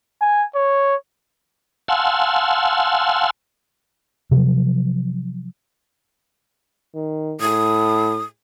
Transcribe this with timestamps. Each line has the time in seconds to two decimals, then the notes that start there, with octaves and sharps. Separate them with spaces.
0.21 G#5
0.55 C#5
1.88 F5 F#5 G#5 A5 C6 E6
4.31 C3 F3 F#3
6.94 D#3
7.40 A2 D#6